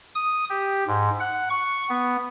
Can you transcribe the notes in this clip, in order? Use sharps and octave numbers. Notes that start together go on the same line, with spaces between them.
D#6
G4
G#2
F#5
C#6
B3